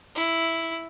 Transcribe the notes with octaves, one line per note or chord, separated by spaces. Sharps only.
E4